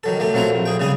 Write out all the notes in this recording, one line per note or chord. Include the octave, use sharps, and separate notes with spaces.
D#3 F#3 A4
F#3 A3 G4 A4
A#2 F#3 C4 E4 A4 A#5
A#1
A#1 G#4 G5
C#3 G3 G#4 G#5